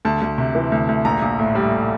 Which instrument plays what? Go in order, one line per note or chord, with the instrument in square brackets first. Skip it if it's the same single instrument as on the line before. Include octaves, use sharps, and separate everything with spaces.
[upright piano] D2 A5
D2
C3
E3
D2
D2
A#1 A#5
A#1
A2
G3